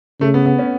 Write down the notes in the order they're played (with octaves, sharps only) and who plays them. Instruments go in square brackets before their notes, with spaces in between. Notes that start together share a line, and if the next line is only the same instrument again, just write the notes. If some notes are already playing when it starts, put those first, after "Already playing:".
[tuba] C#3 [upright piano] A3
[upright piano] B3
B3
C#4